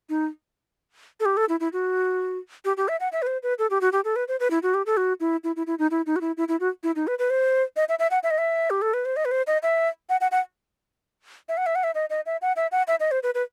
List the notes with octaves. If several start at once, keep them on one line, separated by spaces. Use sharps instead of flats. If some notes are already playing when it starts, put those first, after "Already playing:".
D#4
A4
G4
A4
E4
E4
F#4
G4
G4
E5
F#5
E5
B4
C5
B4
A4
G4
F#4
G4
A4
B4
C5
B4
E4
F#4
G4
A4
F#4
E4
E4
E4
E4
D#4
E4
D#4
F#4
E4
E4
E4
F#4
E4
D#4
B4
B4
C5
D#5
E5
E5
F#5
E5
D#5
E5
G4
A4
B4
C5
D#5
B4
C5
D#5
E5
F#5
F#5
F#5
E5
F#5
E5
F#5
E5
D#5
D#5
E5
F#5
E5
F#5
E5
D#5
C5
B4
B4